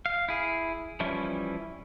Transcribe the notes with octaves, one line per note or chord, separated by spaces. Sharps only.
F5
E4 G#4
E3 F3 G3 C#4 E4